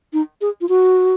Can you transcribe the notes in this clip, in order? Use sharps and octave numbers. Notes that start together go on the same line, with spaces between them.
D#4
G#4
F4
F#4